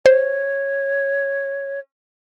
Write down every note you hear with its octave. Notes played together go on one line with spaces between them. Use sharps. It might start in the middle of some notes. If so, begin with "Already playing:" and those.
C5 C#5